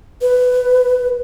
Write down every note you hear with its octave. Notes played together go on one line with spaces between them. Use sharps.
B4